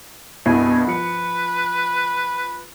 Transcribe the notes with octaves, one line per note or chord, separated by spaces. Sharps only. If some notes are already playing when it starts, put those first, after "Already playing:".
C2 G2 B2 G#5
F3 B4 C#7